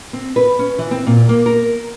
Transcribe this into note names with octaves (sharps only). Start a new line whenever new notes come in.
C4
B4
C#4
E3
C4
A#2
A#3
A#4